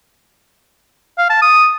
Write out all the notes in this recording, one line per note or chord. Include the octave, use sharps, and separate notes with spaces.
F5
A5
D#6